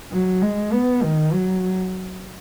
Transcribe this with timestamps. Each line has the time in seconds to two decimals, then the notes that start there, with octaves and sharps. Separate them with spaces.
0.12 F#3
0.42 G#3
0.72 B3
1.03 D#3
1.33 F#3